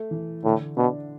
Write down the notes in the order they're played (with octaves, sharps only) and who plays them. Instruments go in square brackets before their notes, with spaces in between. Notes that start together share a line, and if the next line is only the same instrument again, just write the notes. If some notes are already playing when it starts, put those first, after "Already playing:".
Already playing: [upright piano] A3
E3
[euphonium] A2 [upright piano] D3
[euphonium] B2 [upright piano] D4